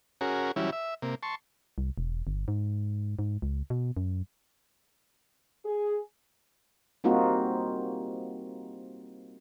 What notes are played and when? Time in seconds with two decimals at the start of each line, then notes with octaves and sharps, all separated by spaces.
0.21 C#4 F#4 G#4 A#4
0.56 E3 F#3 G3 C#4 E4
0.72 E5
1.02 C3 A#3
1.23 A5 C6 C#6
1.78 C2
1.98 E1
2.27 G1
2.48 G#2
3.19 G#2
3.42 C#2
3.70 B2
3.97 F#2
5.65 G#4
7.04 G3 A#3 C4 D#4 F4 F#4